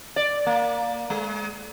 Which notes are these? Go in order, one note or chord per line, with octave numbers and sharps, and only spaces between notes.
D5
A#3
G#3